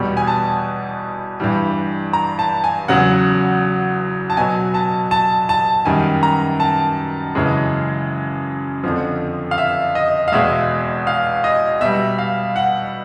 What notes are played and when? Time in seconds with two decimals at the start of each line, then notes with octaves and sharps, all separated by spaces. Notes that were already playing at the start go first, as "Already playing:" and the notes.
Already playing: E2 B2 G3
0.17 G#5
0.27 A5
1.40 G2 E3 G3
2.13 A#5
2.39 A5
2.64 G#5
2.88 E2 C#3 F#3 F#5
4.30 A5
4.37 B2 F#3 G#5
4.74 A5
5.11 A5
5.49 A5
5.85 F#2 D#3 G3 G#5
6.23 A#5
6.60 A5
7.35 F#2 C#3 E3 G#3
8.84 F2 D3 F3
9.51 F5
9.58 E5
9.95 D#5
10.28 F5
10.32 E2 B2 G#3 E5
11.07 F5
11.44 D#5
11.81 B2 G3 E5
12.19 F5
12.56 F#5